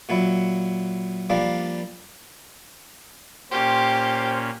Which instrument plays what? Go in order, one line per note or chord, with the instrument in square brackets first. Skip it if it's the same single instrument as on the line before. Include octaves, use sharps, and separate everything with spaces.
[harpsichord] A#2 F#3 E4
F3 G3 A#3 D4
[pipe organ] A#2 C#4 [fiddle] G4 [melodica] C5 C6